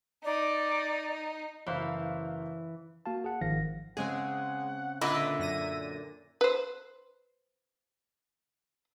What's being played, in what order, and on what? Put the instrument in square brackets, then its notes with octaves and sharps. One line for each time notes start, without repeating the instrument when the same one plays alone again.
[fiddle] D#4 [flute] D5
[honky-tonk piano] F#1 C5 F5 [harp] E3
[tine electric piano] A#3 F#4 F5 A5
G#4 F#5
G#1 D#3 F3 F5 A#6
[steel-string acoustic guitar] C#3 C4 [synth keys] G#3 G#4 [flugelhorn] F#5
[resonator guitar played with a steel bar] A#2 D3 [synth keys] B4 D#5 [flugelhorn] E5
[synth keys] F#2 A#6 D#7
[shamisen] B4 C5